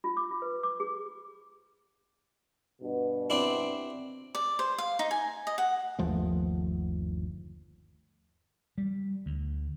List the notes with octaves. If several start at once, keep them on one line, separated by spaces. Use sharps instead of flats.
F4
D6
F4
B4
D6
G#4
G2 B2
C4 D4 E4
D5
C5
F5
D#4
G#5
D#5
F#5
G1 D#2 F3 A3
G3
D2